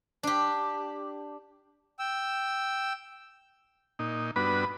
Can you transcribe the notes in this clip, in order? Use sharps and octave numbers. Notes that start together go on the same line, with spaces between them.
D4 G4
G5 E6
A#2 D#4
G2 B3 D4 F#4 B4 B5